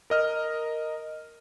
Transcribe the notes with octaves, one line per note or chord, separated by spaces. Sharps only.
A#4 D#5 F6